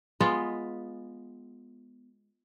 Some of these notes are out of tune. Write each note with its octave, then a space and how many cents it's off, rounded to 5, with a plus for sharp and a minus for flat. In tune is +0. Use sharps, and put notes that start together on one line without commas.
G#3 +0 B3 +0 F4 +10